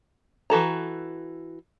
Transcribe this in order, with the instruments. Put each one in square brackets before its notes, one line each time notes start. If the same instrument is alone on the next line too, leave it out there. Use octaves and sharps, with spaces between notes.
[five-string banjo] E3 F#4 A4 A#5